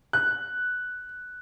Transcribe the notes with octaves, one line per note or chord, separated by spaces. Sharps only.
F#6